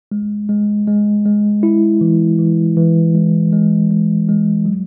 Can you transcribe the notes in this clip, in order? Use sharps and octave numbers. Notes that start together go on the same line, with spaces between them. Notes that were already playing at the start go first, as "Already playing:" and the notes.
G#3
G#3
G#3
G#3
E4
E3
E3
E3
G#3
G#3
G#3
G#3
F#3